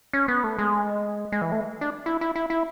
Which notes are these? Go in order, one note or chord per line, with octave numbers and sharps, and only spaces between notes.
C#4
B3
A3
G#3
G#3
E3
A3
D4
E4
E4
E4
E4